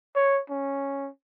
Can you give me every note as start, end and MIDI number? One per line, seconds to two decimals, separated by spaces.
0.16 0.41 73
0.50 1.09 61